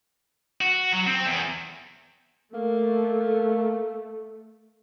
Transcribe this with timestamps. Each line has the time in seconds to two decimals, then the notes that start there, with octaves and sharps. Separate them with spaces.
0.61 F#4
0.93 F#3
1.07 C4
1.26 E2
2.54 A3 A#3